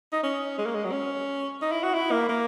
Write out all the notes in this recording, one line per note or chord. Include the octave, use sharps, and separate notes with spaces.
D#4
C#4
G#3
A#3
G#3
F#3
C#4
D#4
E4
F#4
E4
A#3
A#3